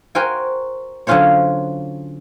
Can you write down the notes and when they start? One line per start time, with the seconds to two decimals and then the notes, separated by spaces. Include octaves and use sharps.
0.15 F#4 A#4 C5 G5 G#5
1.07 D3 F#3 C#4 F4 C5 C#5